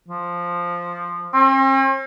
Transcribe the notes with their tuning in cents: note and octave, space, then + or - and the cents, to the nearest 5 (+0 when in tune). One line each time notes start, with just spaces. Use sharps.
F3 +0
C4 +45